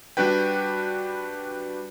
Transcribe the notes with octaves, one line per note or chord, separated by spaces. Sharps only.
G3 D4 F#4 B4 G5